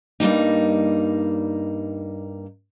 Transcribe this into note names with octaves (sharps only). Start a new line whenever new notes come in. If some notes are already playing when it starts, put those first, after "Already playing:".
G2 G3 A#3 D#4